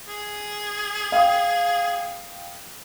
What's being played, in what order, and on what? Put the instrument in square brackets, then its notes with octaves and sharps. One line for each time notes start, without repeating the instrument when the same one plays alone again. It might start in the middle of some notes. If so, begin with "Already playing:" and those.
[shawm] G#4
[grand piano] F5 G5 D#6